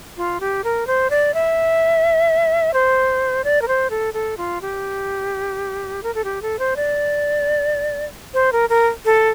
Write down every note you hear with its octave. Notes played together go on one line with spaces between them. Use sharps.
F4
G4
A#4
C5
D5
E5
C5
D5
A#4
C5
A4
A4
F4
G4
A#4
A4
G4
A4
C5
D5
C5
A#4
A#4
A4